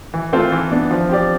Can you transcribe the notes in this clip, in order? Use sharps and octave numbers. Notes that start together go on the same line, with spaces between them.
E3
A3 C4 F4 C5
E3
B3 D4
F3
C4 G4 D5